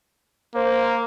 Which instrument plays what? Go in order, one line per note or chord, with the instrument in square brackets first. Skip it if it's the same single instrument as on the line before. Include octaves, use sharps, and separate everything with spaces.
[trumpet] A#3 [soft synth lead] C5